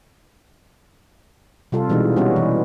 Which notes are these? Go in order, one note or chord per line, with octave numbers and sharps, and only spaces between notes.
C3 G3 F4 A4
B2 E3 G#3 B3 D#4
G3 B3 C#4 F#4
E3